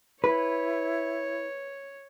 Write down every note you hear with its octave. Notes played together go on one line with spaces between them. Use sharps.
E4 B4 C#5